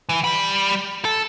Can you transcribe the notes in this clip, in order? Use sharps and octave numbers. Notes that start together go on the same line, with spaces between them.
E3
G3 B5
A4